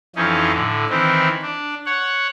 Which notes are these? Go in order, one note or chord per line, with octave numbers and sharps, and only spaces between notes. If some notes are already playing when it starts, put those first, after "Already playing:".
F2 E3 F3 C#4 D#4
A2 D3
D#3 E3 C4 E4
D4
C#5 F#5